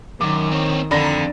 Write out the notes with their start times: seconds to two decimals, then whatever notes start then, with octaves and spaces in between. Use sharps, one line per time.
0.21 F#2 D#3 D6
0.52 C4 C#5
0.91 F2 D3 A#5 B5 A#6